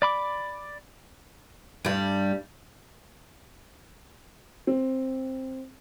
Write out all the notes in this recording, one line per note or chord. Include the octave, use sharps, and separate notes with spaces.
D5 B5 D6
G2 G3
C4